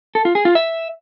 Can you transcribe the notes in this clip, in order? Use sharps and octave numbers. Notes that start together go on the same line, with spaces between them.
A4
F4
G#4
F4
E5